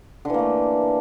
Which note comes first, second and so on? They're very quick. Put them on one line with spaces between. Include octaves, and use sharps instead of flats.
D3 E3 A#3 A3